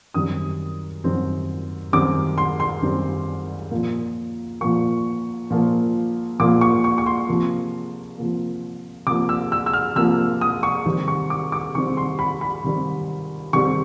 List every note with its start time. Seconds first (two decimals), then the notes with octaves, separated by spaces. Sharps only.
0.14 F#2 D#3 G3 C4 D#6
1.04 F#2 D#3 G3 C4
1.93 F#2 D#3 G3 C4 D6
2.38 C6
2.60 C6
2.82 F#2 D#3 G3 C4
3.71 A#2 F3 A#3
4.61 A#2 F3 A#3 C#6
5.51 A#2 F3 A#3
6.40 A#2 F3 A#3 D6
6.61 C#6
6.84 C#6
6.98 C#6
7.06 C6
7.29 C3 F3 A#3
8.18 C3 F3 A#3
9.07 C3 F3 A#3 D6
9.29 E6
9.52 E6
9.66 E6
9.73 F6
9.96 C3 F3 A#3 E6
10.41 D#6
10.63 C#6
10.86 C3 D#3 G3 C4
11.08 C#6
11.30 D6
11.52 D6
11.75 C3 D#3 G3 C4 C#6
11.97 C6
12.19 B5
12.41 B5
12.64 C3 D#3 G3 C4
13.53 C3 D#3 G3 C4 C#6